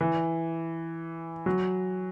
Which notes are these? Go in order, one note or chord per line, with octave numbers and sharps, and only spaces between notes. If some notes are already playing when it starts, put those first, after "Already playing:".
E3
F#3